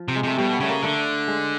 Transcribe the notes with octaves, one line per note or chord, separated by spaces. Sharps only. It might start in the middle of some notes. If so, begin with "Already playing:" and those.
Already playing: F3
C3
G#3
C3 A3
B2 G3
B3
C#3 A3
A#3
D3 A3
G#3